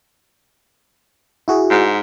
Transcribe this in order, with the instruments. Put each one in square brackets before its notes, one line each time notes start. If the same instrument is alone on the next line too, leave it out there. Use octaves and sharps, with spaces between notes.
[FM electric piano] E4 F#4 G#4
[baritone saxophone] G#2